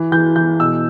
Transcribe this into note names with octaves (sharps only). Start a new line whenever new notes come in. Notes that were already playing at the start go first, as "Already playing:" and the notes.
Already playing: E3
E3 G6
E3 G6
B2 E6